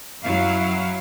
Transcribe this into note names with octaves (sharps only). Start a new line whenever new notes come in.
F#2 F#3 E4 F5